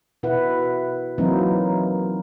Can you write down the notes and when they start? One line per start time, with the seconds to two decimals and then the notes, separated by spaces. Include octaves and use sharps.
0.23 B2 E4 B4 F#5
1.18 E3 F#3 A#3 C4 D#4 E4